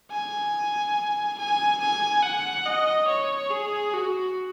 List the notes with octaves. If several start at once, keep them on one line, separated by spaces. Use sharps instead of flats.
G#5
G#5
G#5
F#5
D#5
C#5
G#4
F#4